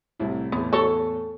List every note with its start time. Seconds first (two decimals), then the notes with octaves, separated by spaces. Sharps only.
0.20 C2 A2 E4
0.52 E2 A2 B3
0.73 F#4 A4 C#5